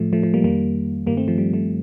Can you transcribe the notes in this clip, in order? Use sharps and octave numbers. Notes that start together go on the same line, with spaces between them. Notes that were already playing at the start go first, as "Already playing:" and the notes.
Already playing: A2 F3 A3
F3 A3
F3 A3
G3 A#3
F2 D#3 G3 A#3
G2 D#3 G3 A#3
A3 C4
F3 A3
G3
F3 A3